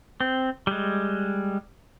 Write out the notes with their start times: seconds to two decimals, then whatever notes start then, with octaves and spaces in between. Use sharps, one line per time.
0.20 C4
0.67 G3 G#3